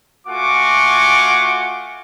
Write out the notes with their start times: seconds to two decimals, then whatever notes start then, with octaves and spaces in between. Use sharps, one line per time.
0.27 A3 F4 F#4 F#5 G#5 D6